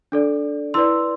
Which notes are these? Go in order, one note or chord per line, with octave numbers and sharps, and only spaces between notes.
D4 A4 D5
E4 B4 D5 C6 E6